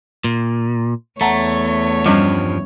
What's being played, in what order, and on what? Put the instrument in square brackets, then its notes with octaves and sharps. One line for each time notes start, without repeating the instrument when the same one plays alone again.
[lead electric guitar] A#2
[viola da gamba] E2 C#5 [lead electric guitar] A3 [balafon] F#5 A5 A#5
[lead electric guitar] G2 F3 [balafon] G3 C#4